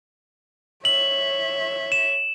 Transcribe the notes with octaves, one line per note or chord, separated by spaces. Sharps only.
C#5 E5 F#7
E7